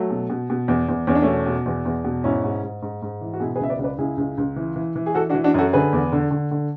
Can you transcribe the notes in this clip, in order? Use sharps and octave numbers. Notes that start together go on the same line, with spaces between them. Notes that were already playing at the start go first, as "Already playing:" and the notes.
Already playing: F#3 A3
B2
B2
B2
E2
E2
E2 C#4
D4
B2 A3 C#4
B2
E2
E2
B2
G#2 C#4 E4
G#2
G#2
G#2
G#2
E3
F#4
B2 E4 G#4
G#4 B4
C#2 E5
B4 D5
C#2
B4 D5
C#2 E4 G#4
C#2
C#2
E3
E3
E3
G#4
E3 F#4 A4
D4 F#4
E3
D4 F#4
F#2 F#4 A4
D3 G#4 B4
E2
D3
D3
D3